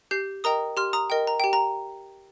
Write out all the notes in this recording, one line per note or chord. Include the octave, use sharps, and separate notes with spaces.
G4 G6 C7
A#4 D#5 G5 A#5 D#6
G4 C6 F6
A#5 D#6
A#4 D#5 G5
A#5
G4 G5
A#5